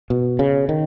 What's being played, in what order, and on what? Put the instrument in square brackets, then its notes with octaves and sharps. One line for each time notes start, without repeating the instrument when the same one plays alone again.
[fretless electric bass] B2
C#3
D#3